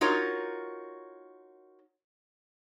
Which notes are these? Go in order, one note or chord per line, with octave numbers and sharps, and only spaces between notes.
D#4 F4 F#4 A#4 C#5